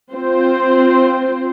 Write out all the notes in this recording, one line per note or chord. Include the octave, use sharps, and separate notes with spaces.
C4 F4 C5